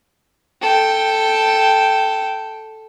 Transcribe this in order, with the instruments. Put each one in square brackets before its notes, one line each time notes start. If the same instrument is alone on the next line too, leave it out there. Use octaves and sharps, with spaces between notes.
[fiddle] A4 G5